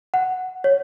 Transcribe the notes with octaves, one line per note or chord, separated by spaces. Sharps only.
F#5
C#5